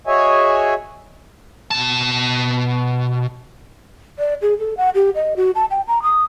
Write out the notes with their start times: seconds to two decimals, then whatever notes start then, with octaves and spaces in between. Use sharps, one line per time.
0.07 F#4 G#4 C#5 D#5 E5 G#5
1.71 B2 A5
4.19 D5
4.42 G#4
4.59 A4
4.77 F#5
4.95 G4
5.15 D#5
5.36 F#4
5.55 A5
5.71 G5
5.88 A#5
6.02 D#6